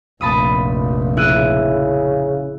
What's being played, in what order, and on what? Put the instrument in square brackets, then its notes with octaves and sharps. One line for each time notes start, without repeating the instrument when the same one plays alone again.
[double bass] F1 A#1 [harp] A5 B5 D#6
[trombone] C#3 [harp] E4 F#6 D#7